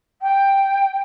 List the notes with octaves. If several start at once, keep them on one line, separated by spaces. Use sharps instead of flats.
G5